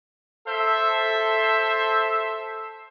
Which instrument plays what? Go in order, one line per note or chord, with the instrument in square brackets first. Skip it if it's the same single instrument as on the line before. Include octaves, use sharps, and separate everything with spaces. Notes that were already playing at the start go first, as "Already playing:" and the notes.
[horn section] A4 C5 E5